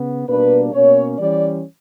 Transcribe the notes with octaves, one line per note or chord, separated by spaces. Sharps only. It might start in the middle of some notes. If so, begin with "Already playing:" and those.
Already playing: C#3 B3
B2 G3 A#3 D4 B4
B2 A#3 C#4 C#5
E3 G3 C#4 D5